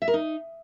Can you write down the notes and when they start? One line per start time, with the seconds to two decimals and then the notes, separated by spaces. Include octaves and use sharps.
0.02 E5
0.08 A#4
0.14 D#4